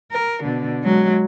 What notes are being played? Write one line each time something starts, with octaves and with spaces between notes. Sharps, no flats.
A#4
B2 D3
F#3 G#3